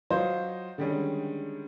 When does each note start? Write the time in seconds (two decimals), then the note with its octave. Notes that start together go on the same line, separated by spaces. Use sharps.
0.10 F#3 F4 C5 C#5 D#5
0.78 D3 D#3 G3 G#3 C#4